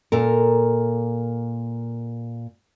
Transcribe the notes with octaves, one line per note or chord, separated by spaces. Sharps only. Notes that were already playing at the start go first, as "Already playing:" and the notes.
A#2 A4 A#4